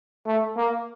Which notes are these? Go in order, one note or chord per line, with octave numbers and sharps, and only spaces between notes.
A3
A#3